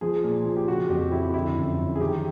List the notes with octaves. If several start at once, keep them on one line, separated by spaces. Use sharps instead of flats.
F3 G#4
A#2
F3
G4
C#3 F#4
F2 G4
F2 E4
D3 E4
F#2
F#2
G#4
D#3 G4